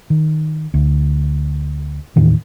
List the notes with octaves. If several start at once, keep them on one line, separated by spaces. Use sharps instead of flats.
D#3
D2
D#2 A2 D#3 E3